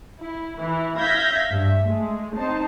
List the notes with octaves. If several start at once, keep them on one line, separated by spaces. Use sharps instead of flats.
E4
E3 E4
E5 F5 G6 G#6 A#6 B6
G2 E5
G#3 A3
C4 D#4 C5 A5